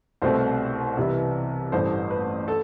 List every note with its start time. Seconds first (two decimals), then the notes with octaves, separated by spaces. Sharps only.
0.22 C2 B2 A3 C4 C5
0.97 C2 C3 E3 B3 E4
1.72 A1 G2 E3 A3 C5
2.11 B4
2.48 A4